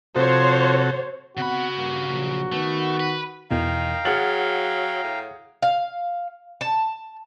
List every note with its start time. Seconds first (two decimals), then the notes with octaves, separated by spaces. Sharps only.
0.16 C3 F3 F#4 A4 C5 C#5
1.37 C#3 B3 C4 F#4 F#5 B5
1.77 G2 A#3
2.09 A#1 F#3
2.52 D#3 A3 B3
3.00 B4
3.51 E2 B2 D#3 E3 F5 G5 A#5
4.05 F#3 G#4 F#5 F6 A6 F#7
5.04 A2
5.62 F5
6.61 A5